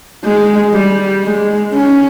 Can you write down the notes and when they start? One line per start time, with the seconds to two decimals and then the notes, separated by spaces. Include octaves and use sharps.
0.24 G#3
0.74 G3
1.23 G#3
1.73 C#4